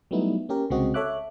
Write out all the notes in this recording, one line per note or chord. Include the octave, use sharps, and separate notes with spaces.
F#3 G3 A3 B3 D#4 E4
A#3 C#4 G4 A#4
C2 C#3 G#3 C4 F#4 D#5
A4 C#5 E5 D6 F#6